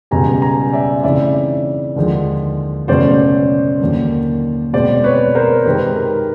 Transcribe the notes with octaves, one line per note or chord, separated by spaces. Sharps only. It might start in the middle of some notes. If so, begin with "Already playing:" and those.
C#2 B2 G3 G#5 A#5
G#5 A#5
D5 E5
C#3 E3 A3 C4 D#4 D5 E5
D#2 D3 F3 G#3
C#2 B2 F#3 A3 C#4 C5 D5
D#2 D3 F#3 A#3
B2 G#3 C4 C5 D5
B4 C#5
A#4 C5
C3 D#3 G#3 C4 B4
A#4